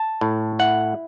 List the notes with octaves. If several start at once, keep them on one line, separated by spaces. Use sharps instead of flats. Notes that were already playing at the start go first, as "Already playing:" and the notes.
Already playing: A5
A2
E4 F#5